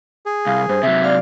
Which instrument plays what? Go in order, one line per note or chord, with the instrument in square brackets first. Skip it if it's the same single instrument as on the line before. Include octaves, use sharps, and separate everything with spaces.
[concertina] G#4
[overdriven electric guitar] C2 [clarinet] F5
[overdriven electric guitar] G2 [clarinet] C5
[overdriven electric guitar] C3 F#3 [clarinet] E5
[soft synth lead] D5 [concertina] F5